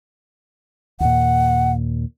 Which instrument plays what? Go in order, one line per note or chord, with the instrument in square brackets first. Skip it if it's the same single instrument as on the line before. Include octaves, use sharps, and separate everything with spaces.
[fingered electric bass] D#2 A#2 [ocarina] F#5